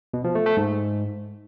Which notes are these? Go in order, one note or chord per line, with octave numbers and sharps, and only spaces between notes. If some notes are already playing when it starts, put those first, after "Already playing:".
B2
F3
A3
A3
G#2